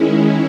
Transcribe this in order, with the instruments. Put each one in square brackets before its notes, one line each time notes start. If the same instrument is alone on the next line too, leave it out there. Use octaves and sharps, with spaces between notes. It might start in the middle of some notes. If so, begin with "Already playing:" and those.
Already playing: [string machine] D#3 G#3 C#4 E4